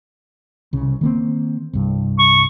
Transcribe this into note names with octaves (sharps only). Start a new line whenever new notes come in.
C2 C#3
D#3 A#3 C4
C2 G2
C#6